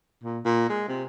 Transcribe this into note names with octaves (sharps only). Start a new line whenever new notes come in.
A#2
A#2
G#3
C3